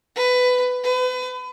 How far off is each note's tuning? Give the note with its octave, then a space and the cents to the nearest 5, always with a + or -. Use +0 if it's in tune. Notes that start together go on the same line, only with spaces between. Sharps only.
B4 +15
B4 +35